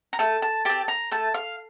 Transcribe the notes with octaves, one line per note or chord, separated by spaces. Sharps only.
A#5
A3 A5
A5
C4 G4 A5
A#5
A3 A5
F5